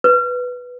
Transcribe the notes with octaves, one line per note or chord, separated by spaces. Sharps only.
B4